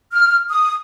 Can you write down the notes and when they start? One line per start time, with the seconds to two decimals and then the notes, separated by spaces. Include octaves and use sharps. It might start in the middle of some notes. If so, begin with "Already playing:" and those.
0.12 F6
0.49 D#6